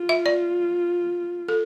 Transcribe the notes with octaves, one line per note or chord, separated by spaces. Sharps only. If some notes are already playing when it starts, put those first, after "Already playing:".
Already playing: F4
E5
D5
A4